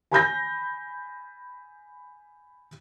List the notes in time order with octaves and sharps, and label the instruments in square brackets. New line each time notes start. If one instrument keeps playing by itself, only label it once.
[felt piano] G#5 B5 G6 A#6